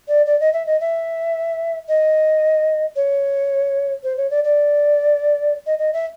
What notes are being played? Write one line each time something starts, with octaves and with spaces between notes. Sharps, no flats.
D5
D5
D#5
E5
D#5
E5
D#5
C#5
C5
C#5
D5
D5
D#5
D#5
E5